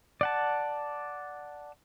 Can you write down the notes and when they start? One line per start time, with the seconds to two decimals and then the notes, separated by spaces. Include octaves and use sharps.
0.21 D5 F#5 A5